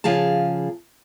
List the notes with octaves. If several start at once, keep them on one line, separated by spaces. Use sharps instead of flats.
C#3 F3 G#4 F5 A5